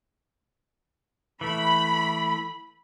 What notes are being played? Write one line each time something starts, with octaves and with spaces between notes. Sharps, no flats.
E3 A3 B5